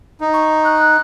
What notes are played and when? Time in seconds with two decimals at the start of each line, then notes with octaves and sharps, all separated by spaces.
0.21 D#4
0.34 C#6
0.65 F#6